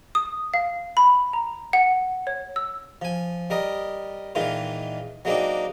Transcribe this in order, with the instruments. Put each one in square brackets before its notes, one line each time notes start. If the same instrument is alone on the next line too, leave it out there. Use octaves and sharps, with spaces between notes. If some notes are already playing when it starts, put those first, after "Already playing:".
[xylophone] D#6
F5
B5
A#5
F#5
C#5
E6
[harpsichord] F3 G#5
G3 A#4 D#5
A#2 D#3 E3 G#3 F4
F#3 G#3 A#3 C4 D4 D#4